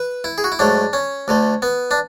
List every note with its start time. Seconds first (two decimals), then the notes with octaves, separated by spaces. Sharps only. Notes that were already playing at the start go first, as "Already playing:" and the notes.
Already playing: B4
0.24 E4
0.38 G#4
0.44 F#4
0.52 E4
0.59 G#2 F#3 A3 D4
0.93 C#4
1.28 D2 D3 A3
1.62 B3
1.91 D4